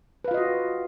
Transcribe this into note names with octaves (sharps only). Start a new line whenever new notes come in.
F4 F#4 B4 D#5 F5